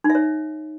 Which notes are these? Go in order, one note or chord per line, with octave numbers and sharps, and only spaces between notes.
D#4
E5
C#5